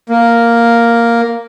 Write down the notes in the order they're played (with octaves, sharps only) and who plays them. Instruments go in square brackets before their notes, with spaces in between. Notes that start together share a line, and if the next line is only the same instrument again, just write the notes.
[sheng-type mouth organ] A#3